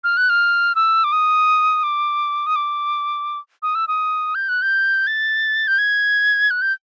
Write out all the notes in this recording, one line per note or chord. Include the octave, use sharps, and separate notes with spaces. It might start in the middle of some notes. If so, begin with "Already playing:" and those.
F6
F#6
F6
E6
D6
D#6
D6
D#6
D6
D#6
E6
D#6
G6
F#6
G6
A6
G6
G#6
F#6
G6